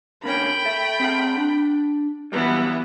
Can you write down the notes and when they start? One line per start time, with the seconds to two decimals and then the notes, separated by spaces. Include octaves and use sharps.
0.24 D3 A#3 C#4 G5 B5
0.65 A4 E5
1.00 C4 G#4 F#5
1.37 D4
2.32 A#2 E3 F#3 G3 B3